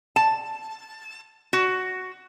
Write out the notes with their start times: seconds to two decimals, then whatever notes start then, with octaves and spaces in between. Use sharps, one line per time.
0.16 A5
1.53 F#4